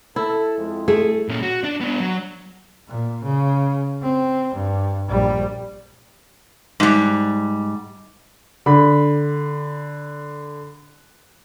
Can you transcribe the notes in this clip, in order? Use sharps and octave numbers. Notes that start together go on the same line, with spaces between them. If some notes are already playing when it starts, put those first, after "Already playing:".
E4 A4
F2 G#3
A3 G#4
A#2 C#4
F#4
D4 D5
B3 D4
F#3
A#2
C#3
C4
G2
A#1 G3
G#2 G3
D3 B5